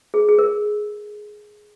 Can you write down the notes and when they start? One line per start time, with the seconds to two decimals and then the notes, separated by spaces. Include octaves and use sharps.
0.14 G#4
0.29 G#4
0.39 A#4